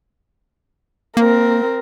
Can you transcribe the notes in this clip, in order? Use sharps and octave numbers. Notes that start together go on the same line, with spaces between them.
A#3 C4 A#4